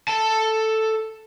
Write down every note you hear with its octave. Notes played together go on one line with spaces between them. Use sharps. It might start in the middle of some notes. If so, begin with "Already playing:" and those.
A4 A5